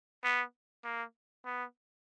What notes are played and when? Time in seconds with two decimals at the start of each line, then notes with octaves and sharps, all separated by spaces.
0.24 B3
0.85 A#3
1.45 B3